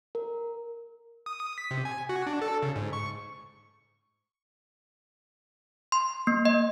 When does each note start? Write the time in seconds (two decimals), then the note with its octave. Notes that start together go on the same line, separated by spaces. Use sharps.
0.15 A#4
1.26 D#6
1.40 D#6
1.58 B6
1.71 C3
1.85 G#5
2.09 F#4
2.27 D4
2.41 A4
2.63 C#3
2.76 G#2
2.93 C#6
5.92 C6
6.27 A#3
6.45 D#5